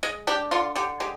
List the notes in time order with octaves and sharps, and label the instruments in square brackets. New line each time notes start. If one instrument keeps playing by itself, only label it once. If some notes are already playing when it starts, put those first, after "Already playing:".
[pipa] G#3 D#5
D4 G4
D3 F4
D3 G4
G#3 G4